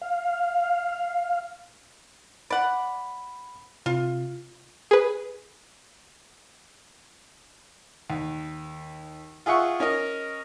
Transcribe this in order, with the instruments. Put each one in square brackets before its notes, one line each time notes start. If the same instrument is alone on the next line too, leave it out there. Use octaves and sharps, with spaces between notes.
[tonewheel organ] F5
[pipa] D5 F#5 [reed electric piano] B5
[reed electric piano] C3 [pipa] F4
[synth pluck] G#4 B4
[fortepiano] D#2
F4 G#4 E5 F#5 C#6
C#4 A#4 D#5